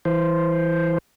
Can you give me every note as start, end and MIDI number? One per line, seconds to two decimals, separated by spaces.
0.05 0.98 52
0.05 0.98 72